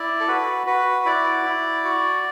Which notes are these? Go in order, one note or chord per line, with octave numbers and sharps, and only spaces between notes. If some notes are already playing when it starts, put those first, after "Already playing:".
Already playing: E4 D5
A4
F#4 B4
F#4 B4
E4 D5
E4
F#4